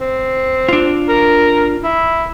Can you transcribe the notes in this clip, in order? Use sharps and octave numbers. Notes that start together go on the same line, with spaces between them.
C4
D4 F4
A#4
E4